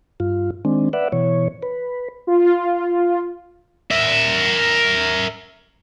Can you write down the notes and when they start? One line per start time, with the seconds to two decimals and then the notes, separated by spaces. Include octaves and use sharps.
0.20 G2 F4
0.65 D#3 G#3 C4 D4
0.93 B4 D5 E5 F#5
1.12 B2 E3 C#5
1.63 B4
2.27 F4
3.91 A#4 E5